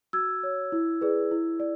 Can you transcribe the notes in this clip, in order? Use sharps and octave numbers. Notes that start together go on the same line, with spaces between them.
F#4 E6 G#6
C#5
E4
G#4 B4 D5
E4
D5